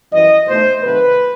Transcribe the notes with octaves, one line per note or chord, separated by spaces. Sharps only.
F#2 E3 G3 D#5
B2 A3 D#4 C5
C3 D#3 F#3 A3 B4